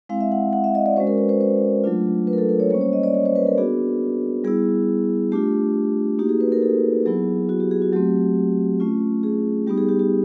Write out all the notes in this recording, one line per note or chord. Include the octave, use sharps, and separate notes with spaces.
G#3 C4 E4 F5
E5
F#5
F#5
E5
D#5
D5
G#3 C#4 F#4 C5
A#4
B4
C5
C5
F#3 A3 D4 F4
B4
A#4
A4
A#4
C#5
G3 A#3 C#4 C5
C#5
D#5
D5
C#5
C5
B4
A#4
B3 D4 F#4 G#4
G3 B3 E4 G#4
A3 D4 F4 G4
A#3 D#4 F#4 G4
G#4
B4
A#4
A4
F#3 B3 E4 G#4
F#4
G4
G#4
F#4
F#3 A3 C4 G4
A3 C#4 F4
G#4
G3 B3 D#4 G4
G#4
G4
G4